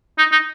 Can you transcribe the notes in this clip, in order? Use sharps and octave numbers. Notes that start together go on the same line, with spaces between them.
D#4
D#4